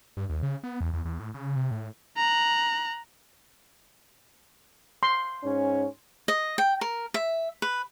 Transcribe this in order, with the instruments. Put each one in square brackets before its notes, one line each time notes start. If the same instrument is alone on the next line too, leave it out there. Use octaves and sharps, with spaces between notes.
[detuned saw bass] G2
D#2
C#3
B3
E2
E2
E2
A2
C#3
C3
A2
[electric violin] A#5 F#6
[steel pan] C6
[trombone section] G#2 C#4
[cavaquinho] D#5
G5
A#4
E5
B4